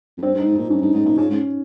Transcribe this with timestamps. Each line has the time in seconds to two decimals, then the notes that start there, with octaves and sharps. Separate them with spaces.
0.18 F2
0.22 G2 C4
0.35 G2
0.38 D#4
0.46 G#2
0.55 D#4
0.58 A#2
0.70 G2 C#4
0.82 G2 D#4
0.94 G#2 D#4
1.06 A#2 F4
1.18 C#3 C#4
1.30 G#2